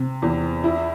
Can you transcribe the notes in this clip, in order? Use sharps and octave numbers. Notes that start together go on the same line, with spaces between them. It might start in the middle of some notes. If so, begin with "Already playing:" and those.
Already playing: C3
E2
E4